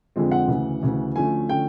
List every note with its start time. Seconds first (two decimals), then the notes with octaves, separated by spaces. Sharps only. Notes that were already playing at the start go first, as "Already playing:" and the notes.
0.16 F2 D3 F3 G#3 C4
0.31 F#5
0.48 D2 C#3 E3
0.83 D2 C#3 E3
1.16 D2 D3 F3 A3 C#4 G#5
1.49 D3 F3 A3 C#4 G5